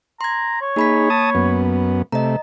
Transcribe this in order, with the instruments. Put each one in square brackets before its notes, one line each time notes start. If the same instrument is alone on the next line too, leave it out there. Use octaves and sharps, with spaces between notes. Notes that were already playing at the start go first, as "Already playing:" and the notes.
[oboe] A#5 [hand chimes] C6 G#6
[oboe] C#5
[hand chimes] A#3 B5 B6 [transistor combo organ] D#4 G#4
[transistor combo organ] A5 D#6
F#2 B3
[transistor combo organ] C3 A3 [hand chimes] D#5 A#5